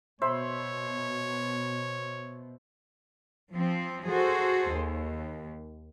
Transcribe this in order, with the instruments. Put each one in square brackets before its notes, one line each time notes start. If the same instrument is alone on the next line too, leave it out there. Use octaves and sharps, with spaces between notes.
[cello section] B2 [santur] C5 E5 B5 [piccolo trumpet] C#5
[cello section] F3 C4
F#4 G#4 A4 C5
D#2